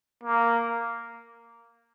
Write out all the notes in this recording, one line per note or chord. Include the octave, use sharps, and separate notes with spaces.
A#3